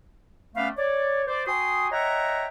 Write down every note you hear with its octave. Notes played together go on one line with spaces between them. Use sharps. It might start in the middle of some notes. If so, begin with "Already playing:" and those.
A3 B3 C#4 B4 D5 F5
C#5 D5
C5 D5
F#4 G5 G#5 C6 D#6
C#5 D#5 E5 F#5 G5 A#5